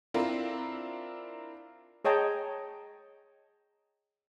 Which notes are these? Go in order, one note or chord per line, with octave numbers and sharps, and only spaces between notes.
C4 D4 E4 F4 A#4
G#4 C#5 D#5 G5 A5 A#5